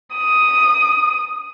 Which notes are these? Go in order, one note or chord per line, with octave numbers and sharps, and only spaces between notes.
D#6